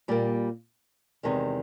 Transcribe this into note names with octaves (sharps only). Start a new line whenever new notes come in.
A#2 G3 A#3
E2 C3 D#3 G#3